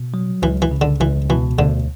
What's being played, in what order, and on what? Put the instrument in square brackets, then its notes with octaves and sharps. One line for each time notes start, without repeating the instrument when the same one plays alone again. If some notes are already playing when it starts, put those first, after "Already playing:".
Already playing: [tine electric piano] B2
F#3
[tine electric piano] C#2 [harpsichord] E3
[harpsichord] E3
[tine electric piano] C#3
[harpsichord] D3
[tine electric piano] C#2 [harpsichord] E3
[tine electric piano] B2 [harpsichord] E3
[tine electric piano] D2 [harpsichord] D3